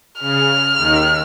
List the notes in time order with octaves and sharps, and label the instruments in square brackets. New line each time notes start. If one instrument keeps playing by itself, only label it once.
[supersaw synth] C#3 [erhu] F6
[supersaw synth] D#2 D#3